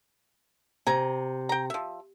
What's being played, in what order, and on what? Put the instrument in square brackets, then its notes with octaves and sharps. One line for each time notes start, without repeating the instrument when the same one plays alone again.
[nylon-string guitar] C3 [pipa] G#5 A#5
[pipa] G5 A#5
F3 E5